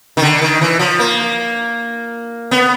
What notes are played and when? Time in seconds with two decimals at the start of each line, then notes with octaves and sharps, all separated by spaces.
0.17 D#3
0.22 D3
0.42 D#3
0.61 E3
0.79 F3
0.99 A#3
2.51 B3